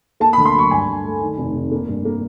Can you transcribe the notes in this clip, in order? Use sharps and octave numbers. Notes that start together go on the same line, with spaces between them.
A#3 A5
B5
D2
C6
F#3 C#6
G2 G#5
G2
A3
D#3
F1
C3
A#3
G2
A#3